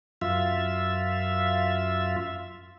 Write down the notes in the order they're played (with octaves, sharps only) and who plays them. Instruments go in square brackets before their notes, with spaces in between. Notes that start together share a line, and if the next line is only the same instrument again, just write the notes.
[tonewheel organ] F#2 F4 E5